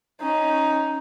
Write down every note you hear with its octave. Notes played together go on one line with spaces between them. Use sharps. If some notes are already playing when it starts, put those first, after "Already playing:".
C#4 D#4